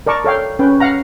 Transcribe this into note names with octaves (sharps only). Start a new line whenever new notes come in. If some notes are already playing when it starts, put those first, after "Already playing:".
A#4 D5 A5 C#6
A4 C#5 F5 G5
C#4 B4 G5
F5 F#5 A#5